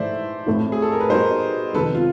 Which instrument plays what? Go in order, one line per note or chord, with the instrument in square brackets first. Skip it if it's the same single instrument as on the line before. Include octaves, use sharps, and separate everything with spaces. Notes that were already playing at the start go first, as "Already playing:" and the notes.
Already playing: [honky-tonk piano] G#2 E3 A3 [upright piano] C5 D5 E5
[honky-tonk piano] A2 E3 A3 C4 E4
[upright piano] G#4
A4
A#4
B4
[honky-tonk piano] G3 B3 D#4 F#4 [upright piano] A#4 C5
[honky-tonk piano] F2 C3 D#3 G#3 B3 [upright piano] A4 B4
[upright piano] F4